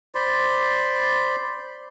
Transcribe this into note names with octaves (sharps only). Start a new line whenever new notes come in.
C5 D5 B5 C6